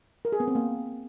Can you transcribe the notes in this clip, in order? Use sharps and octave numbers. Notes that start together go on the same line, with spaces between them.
A#4
G#4
B3
C4
A#3